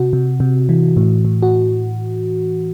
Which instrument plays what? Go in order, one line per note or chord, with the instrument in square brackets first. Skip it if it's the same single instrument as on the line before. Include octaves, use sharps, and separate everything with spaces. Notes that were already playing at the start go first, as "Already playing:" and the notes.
Already playing: [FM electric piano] C3 F#4
C3
C3
E3
A2
A2
F#4